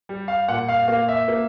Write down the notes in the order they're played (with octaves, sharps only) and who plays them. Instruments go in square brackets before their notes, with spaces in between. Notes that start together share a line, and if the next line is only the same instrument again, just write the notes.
[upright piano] G3
F5
A#2 F#5
F5
A#3 F5
E5
A#3